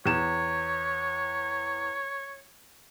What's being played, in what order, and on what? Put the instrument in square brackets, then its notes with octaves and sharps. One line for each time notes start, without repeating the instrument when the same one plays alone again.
[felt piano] E2 E7 [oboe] C#5